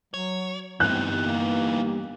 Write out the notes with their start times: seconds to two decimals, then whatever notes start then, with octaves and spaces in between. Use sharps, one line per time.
0.14 F#3 C#5
0.80 G2 E3 B3 C4 D#4 G4 F#6
1.23 A#3